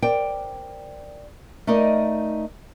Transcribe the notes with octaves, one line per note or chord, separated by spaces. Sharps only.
A#4 C5 D5 G5
A3 D#4 A#4 D5 D#5